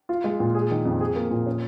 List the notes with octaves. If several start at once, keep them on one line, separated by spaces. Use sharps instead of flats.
F4
G#3
A#2
G#4
D#3
F2
G#4
A#3
A#2
C#4